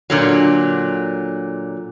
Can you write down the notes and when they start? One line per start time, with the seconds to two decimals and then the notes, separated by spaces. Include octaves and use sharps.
0.10 A#2 D3 F#3